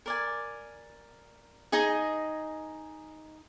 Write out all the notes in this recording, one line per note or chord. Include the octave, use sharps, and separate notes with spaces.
A#4 D5 G#5
D#4 G#4 D#5 G#5